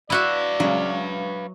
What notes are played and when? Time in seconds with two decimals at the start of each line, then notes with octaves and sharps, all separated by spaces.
0.10 E4 F#4 B4 D5 E5 F5
0.60 C#3 F#3 G#3